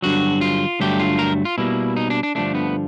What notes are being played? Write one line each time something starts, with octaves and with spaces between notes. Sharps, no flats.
G2 D3 F#3 F#4
F4
G2 D3 F#3 A3 G4
F4
A#4
F4
B2 G3 A#3 E4
D#4
D4
D4
G2 D3 F3 A3 D4
B3